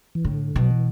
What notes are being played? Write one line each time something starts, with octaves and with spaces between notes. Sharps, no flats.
E3
A2 D3
B2 F#3
E3